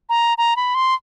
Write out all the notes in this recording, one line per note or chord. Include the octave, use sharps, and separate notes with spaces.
A#5
A#5
B5
C6